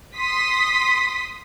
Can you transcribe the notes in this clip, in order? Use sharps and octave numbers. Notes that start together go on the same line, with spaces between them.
C6 D#6 B6